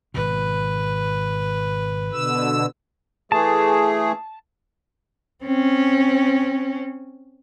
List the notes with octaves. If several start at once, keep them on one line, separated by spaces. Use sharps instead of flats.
G#1 B2 B4
B2 D3 E6
E3 A3 G#4 A5
C4 C#4